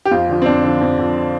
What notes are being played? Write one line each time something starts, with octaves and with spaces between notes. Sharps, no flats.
G4
F2 F4
D3 F3
C4
F2 D4
D3 F3
F2
D3 F3